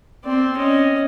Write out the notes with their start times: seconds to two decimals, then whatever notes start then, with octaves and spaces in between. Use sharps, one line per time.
0.24 C4 D5
0.57 C#4 D#5